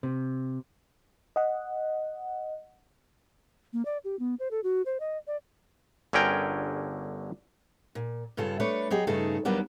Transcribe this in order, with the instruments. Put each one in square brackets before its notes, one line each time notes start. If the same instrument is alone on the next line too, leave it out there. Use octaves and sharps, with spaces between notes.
[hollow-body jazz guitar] C3
[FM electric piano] D#5 F#5
[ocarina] A#3
D5
G4
B3
C5
A4
F#4
C5
D#5
D5
[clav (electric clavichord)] G1 D3 C#4 G#4 A#4 G5
[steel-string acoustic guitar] A#2
G2 C#3 F4 A4
A3 D4 B4 C#5
F#3 G4 G#4 D#5
G2 C#3 A3 D#4 G#4 A4
D#2 F#3 G3 A#3 B3 D4